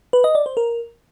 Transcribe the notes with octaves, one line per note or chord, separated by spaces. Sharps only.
B4
D#5
D5
C5
A#4